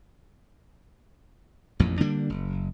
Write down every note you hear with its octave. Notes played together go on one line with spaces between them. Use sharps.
A1 F2 A#2
D3 G3 A#3 D4
F#1